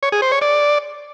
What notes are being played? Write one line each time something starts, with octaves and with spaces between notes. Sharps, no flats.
C#5
G#4
C5
C#5
D5